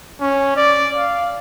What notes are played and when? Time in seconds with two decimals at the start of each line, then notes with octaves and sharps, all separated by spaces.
0.20 C#4
0.56 D5
0.96 F5